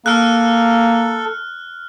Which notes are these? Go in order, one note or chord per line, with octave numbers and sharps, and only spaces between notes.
A#3 A4 F6 F#6